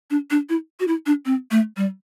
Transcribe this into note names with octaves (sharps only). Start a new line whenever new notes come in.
D4
D4
E4
F#4
E4
D4
C4
A3
G3